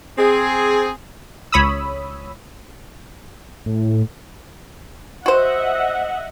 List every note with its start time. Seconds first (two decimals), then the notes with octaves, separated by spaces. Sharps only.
0.18 C4 G#4
1.52 C#2 C#5 B5 D#6 E6
3.66 A2
5.26 F#4 C5 D#5 E5 F#5